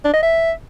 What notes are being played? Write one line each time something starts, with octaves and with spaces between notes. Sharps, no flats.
D4
D#5
E5